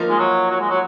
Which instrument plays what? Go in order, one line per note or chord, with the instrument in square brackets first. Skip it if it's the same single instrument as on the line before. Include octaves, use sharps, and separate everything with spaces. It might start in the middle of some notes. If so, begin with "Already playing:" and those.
Already playing: [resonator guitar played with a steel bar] F3 A#3 D#4 A#4
[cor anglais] G#3
F#3
F#3
G#3
F#3